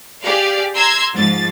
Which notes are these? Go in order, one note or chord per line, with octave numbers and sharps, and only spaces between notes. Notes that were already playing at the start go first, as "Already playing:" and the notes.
G4 G#4 D5 F5
A#5 C6 E6 G#6
G#2 F3 A6